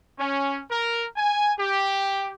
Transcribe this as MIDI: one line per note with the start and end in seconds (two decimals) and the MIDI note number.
0.18 0.60 61
0.70 1.04 70
1.16 1.52 80
1.58 2.32 67